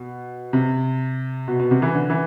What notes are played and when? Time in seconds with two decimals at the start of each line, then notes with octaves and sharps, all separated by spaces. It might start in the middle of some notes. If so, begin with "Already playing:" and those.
Already playing: B2
0.53 C3
1.48 B2
1.60 B2
1.71 C3
1.82 E3
1.95 D3
2.10 E3